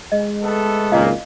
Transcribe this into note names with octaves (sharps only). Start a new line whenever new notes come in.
G#3 D#5
A3 B3 A4
G#1 C#2 A#2 D#5 F5